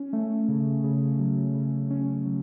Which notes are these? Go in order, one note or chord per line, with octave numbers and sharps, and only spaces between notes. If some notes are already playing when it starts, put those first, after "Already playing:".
Already playing: C#4
A3
C#3
C#3
F#3
C#3
C#4
F#3